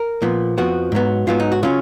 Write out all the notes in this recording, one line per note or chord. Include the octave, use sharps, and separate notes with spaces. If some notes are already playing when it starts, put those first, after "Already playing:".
Already playing: A#4
A#2 F3 B3
F2 F3 B3 F#4
G#2 F#3 B3
G#2 F#3 B3 F4
D#4
F#4
C#3 F#3 C#4 F4